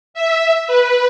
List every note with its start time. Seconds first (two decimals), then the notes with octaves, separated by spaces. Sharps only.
0.14 E5
0.68 B4